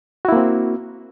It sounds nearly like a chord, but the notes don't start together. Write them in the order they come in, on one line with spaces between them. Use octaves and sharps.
F#4 E4 A#3 C4